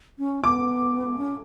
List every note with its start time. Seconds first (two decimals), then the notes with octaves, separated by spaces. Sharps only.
0.18 C#4
0.43 B3 D6
1.18 C#4